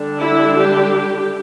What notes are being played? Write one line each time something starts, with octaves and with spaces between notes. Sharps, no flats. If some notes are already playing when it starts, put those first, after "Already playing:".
Already playing: D3 G3 D4
E4
G4